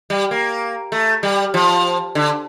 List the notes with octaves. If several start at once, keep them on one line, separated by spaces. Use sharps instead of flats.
G3
A#3
A3
G3
F3
D3